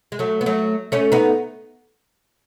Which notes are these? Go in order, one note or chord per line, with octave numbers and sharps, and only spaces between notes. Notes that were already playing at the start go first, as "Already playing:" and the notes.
G#3
F#3 A3
B3
F#3 A3
A3 C#4
B3 D#4